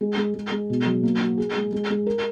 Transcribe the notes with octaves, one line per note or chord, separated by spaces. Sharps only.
G#3
G#3
G#3
G#3
B2
F#3
A#3
F#4
G#4
G#3
G#3
G#3
A#4